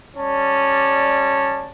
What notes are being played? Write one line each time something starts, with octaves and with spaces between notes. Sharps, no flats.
G3 C#4 D5 A5